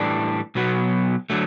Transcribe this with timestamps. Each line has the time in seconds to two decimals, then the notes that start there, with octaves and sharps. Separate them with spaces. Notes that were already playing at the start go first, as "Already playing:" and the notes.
Already playing: A2 E3 G3 D4
0.55 B1 B2 F#3 B3
1.30 D3 F#3 A3